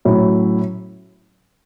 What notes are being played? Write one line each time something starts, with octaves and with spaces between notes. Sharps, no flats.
A2 F#3 C#4 E4